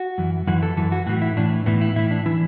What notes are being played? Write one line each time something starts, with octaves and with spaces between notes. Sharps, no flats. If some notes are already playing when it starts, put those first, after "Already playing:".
Already playing: F#4
F#2 E3
F#2 E3 F#4
A4
F#2 E3 A4
F#4
A2 E3 F#4
E4
A2 E3 D4
A2 E3 B3
E4
A2 E3 E4
D4
E3 E4